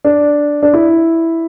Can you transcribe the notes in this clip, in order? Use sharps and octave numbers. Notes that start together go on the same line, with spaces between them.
D4
D4
E4